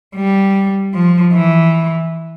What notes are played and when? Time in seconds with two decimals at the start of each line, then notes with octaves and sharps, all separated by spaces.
0.16 G3
0.94 F3
1.34 E3